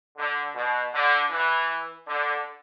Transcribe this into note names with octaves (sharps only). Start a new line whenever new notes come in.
D3
B2
D3
E3
D3